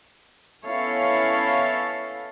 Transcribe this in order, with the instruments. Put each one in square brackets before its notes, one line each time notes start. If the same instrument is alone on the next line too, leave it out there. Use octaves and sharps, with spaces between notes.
[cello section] B3 C#4 E4 A4 C#5 F5